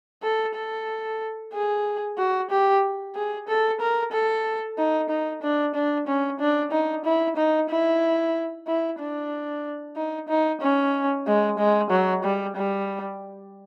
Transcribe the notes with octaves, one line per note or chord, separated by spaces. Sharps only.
A4
A4
G#4
F#4
G4
G#4
A4
A#4
A4
D#4
D#4
D4
D4
C#4
D4
D#4
E4
D#4
E4
E4
D4
D#4
D#4
C#4
G#3
G#3
F#3
G3
G3